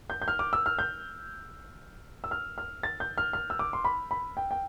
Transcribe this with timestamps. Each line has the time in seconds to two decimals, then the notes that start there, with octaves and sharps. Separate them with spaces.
0.10 G6
0.22 G6
0.28 F6
0.39 D6
0.53 E6
0.66 F6
0.79 G6
2.24 E6
2.31 F6
2.58 F6
2.83 A6
3.00 G6
3.18 F6
3.33 F6
3.50 E6
3.59 D6
3.73 C6
3.85 B5
4.11 B5
4.37 G5
4.51 G5